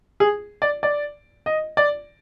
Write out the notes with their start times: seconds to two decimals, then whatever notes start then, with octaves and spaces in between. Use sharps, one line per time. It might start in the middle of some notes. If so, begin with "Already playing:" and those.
0.20 G#4
0.62 D5
0.83 D5
1.46 D#5
1.77 D5